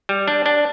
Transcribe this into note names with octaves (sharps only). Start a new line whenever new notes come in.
G3
D4
D4